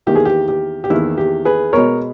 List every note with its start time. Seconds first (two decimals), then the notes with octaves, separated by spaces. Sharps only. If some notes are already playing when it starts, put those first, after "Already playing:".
0.07 E2 D#3 A#3 G4
0.15 G#4
0.25 G4
0.48 G4
0.84 G4
0.90 E2 D#3 A#3 E4
1.18 G4
1.45 G#4 B4
1.73 B2 G#3 B3 A#4 C#5